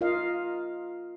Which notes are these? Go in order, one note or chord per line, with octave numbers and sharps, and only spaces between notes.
F4 A#4 D#5 F5